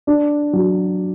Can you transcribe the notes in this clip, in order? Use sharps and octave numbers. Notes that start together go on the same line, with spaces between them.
D4
F#3